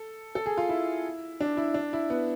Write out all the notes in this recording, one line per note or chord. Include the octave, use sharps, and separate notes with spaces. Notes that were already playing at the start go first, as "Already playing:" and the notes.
Already playing: A4
A4
G#4
F4
E4
D4
E4
D4
E4
B3